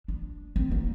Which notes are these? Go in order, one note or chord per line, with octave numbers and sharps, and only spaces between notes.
D4
C4
A#3